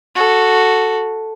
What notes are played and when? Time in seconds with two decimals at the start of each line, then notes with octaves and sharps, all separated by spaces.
0.15 F#4 A4